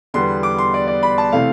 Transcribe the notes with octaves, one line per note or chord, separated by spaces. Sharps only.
E2 D3 G3 B3 C6
D6
C6
D5
D5
B5
A5
C3 E3 A3 F5